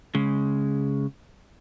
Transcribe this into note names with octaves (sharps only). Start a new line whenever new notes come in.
C#3 G#3